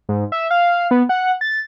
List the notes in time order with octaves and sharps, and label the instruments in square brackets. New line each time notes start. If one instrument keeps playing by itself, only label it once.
[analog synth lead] G#2
E5
F5
B3
F#5
A6